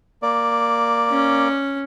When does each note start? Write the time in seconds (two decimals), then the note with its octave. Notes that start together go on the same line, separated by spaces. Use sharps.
0.22 A#3 D5
1.10 C#4